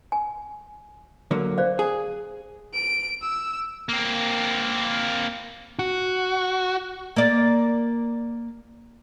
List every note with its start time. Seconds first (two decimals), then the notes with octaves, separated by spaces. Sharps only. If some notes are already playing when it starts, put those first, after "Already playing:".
0.12 G#5
1.31 D3 F#3 A#3
1.58 C5 D5 F5
1.79 G#4
2.74 D7
3.22 E6
3.89 A#3 C4
5.79 F#4
7.16 A#3 D5